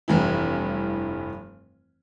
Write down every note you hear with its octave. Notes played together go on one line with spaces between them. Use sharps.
F1 G2 E3 E4